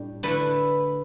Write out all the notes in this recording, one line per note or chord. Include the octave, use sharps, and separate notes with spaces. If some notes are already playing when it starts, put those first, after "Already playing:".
Already playing: A2 G3 D4
D3 A3 E4 B4